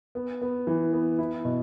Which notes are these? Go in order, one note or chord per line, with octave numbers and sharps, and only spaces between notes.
B3
B3
E3
B3
E4
B2